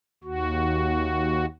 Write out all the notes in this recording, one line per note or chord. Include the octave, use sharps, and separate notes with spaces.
D#2 F#4